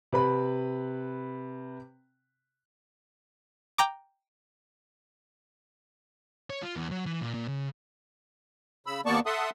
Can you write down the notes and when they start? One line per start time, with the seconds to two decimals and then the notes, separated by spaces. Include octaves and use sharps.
0.13 C3 B4 B5
3.78 G5 A#5 D6
6.50 C#5
6.63 F4
6.76 E2
6.91 F#3
7.06 E3
7.22 A#2
7.34 A#2
7.48 C#3
8.87 C#3 B5 E6
9.06 D#2 A#3 B3 D5 A5 C#6
9.26 A4 E5 F#5 A5 C6 D#6